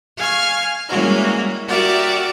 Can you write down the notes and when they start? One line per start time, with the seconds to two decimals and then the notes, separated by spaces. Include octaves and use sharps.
0.17 F5 G#5 C#6 F6
0.89 E3 G3 G#3 A#3 C#4 F#4
1.67 F#4 G4 A#4 D5 E5 F#5